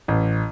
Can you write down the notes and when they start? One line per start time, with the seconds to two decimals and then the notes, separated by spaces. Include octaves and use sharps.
0.08 A1